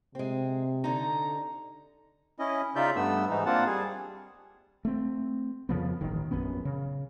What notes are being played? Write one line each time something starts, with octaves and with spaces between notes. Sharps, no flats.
C3 G#3 C4
D3 D#4 A#5
C#4 E4 D#5
C#3 D#4 F4 D5 E5 G6
G2 A3 B3 E6
G#2 E3 D#4
A#3 C4 D4 F4 F#5 A5
G3 G#4
A3 C4
F2 C#3 F3 B3
E1 A1 D#3
A#1 F#2 B3 C#4
C#3